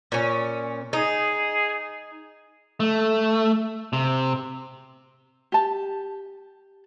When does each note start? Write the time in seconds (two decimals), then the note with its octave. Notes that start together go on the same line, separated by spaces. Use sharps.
0.12 A#2 C#4
0.93 D#4 G#4
2.80 A3
3.93 C3
5.52 G4 A5